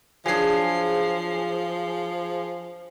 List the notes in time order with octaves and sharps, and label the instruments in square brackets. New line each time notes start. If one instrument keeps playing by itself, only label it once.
[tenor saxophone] F3 [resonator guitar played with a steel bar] F#3 D4 [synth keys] G#4 C7